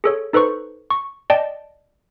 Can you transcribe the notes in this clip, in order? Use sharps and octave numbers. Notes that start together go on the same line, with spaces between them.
G#4 A4 C#5
D#4 A4 B4 C5 C#6
C#6
D5 D#5 G5 A5